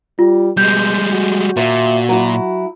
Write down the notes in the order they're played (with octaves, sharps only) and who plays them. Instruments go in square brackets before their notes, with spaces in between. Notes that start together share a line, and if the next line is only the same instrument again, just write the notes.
[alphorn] G3 [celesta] F4
[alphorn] B2 [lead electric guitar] G3 G#3 [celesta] G6
[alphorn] F#4
[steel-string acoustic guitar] D#2 E5 [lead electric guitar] A#2
[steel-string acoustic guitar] F#3 E4